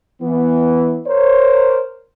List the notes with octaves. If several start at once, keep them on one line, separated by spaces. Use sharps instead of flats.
E3 B3
A#4 C5 C#5